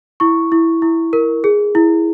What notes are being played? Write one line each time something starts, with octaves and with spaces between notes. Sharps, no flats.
E4 C#6
E4
E4
A#4
G#4
E4